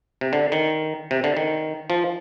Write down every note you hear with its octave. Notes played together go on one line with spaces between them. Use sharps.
C3
D3
D#3
C3
D3
D#3
F3